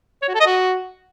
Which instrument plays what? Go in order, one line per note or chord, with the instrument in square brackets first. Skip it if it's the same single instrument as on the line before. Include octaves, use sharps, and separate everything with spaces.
[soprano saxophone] C#5
F#4
A4
D#5
F#4